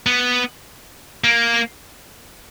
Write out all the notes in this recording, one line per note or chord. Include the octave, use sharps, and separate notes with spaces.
B3
A#3